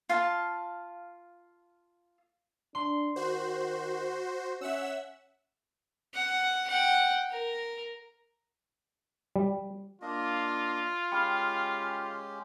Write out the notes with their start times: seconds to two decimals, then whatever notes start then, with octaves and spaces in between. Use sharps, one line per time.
0.09 F4 F5 A5
2.75 D4 C6
3.16 D#3 F#4 C5
4.61 C#4 E5 F#5 E6
6.14 F#5
6.68 F#5 G5
7.30 A#4
9.36 G3
10.02 A#3 D4 F4 D#5
11.12 G#3 C#4 G4 G5 B5 F6